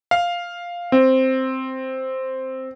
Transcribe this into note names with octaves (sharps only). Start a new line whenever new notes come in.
F5
C4